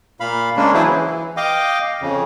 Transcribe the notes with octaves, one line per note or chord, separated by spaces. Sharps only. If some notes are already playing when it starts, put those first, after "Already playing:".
A#2 F5 B5
C#3 G#3 A#3 C#4 D4
E3 F#3 E4 G#4 B4 C5
E3
D#5 F5 G5 D6
F2 C#3